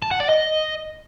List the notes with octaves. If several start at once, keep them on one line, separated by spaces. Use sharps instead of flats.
A5
F#5
D5
D#5